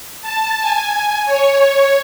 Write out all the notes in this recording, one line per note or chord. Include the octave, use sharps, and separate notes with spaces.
A5
G#5
C#5